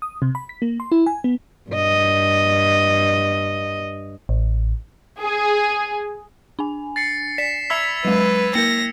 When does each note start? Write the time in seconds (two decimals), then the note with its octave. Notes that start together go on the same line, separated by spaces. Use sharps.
0.02 D#6
0.22 C3
0.35 B5
0.49 B6
0.62 A#3
0.80 C6
0.92 E4
1.06 G#5
1.24 B3
1.71 G2 D#5
4.29 A1
5.22 G#4
6.59 D4 G#5
6.96 A6 C7 C#7
7.38 D5 B6 E7
7.70 E5 B5 E6 G#6 B6 F7
8.05 F#3 G#3 B4
8.55 A#3 A#4 A#6 C#7